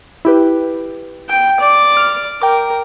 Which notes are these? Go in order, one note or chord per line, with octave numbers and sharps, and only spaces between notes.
E4 G4 B4
G5
D5 D6
F6
A#4 G5 D6